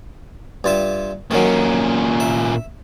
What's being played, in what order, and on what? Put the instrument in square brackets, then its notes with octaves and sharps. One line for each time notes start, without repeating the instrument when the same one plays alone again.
[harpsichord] G2 F4 E5
[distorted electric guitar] A#2 C#4 [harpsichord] D#3 F#3
[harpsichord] E5